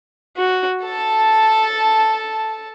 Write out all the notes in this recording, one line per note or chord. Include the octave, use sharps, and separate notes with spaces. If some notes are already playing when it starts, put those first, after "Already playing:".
F#4
A4 A5